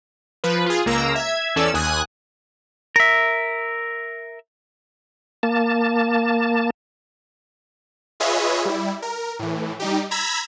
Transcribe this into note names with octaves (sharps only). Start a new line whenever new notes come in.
F3 B4
F4 G#4
C#2 A#3 A#5 E6
E5 G#6
E2 C#4 A4 D5 E6 E7
D#2 G#5 D#6 F#6
A#4 E5
A#3 A5
F4 G#4 B4 C#5 D#5 E5
G3 E4
A#4
A2 E3
G3 D#4 G4
A#5 B5 E6 G#6 B6